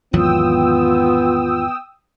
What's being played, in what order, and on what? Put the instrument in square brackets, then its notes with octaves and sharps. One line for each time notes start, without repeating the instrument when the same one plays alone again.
[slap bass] G#1 E2 F#3 [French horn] B3 [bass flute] F4 [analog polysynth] G5 D#6 E6